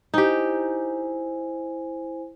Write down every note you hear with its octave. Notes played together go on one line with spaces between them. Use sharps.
D#4 E4 G4 C5 G#5